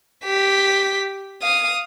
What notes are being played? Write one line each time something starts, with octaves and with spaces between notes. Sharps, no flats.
G4 B6
F5 D#6